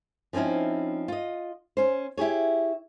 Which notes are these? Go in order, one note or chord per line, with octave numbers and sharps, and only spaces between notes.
F3 C4 C#4 D#4 E4
F4 D#5
C#4 C5
E4 G4 G#4 C#5